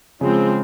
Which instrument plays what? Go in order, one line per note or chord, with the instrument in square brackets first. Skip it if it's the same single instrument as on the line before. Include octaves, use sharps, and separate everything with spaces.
[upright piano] C#3 [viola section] F3 G#3 C4